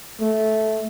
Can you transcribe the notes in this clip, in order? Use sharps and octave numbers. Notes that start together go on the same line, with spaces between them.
A3